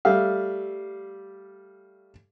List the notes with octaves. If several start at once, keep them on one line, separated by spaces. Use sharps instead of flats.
G3 A3 E5 F5